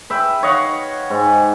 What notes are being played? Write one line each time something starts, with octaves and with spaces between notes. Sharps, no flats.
B4 E5 G5
C#5 D#5 F5 F#5
G#2